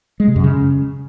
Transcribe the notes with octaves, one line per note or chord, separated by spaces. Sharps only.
G#3
C3
F#2
C#3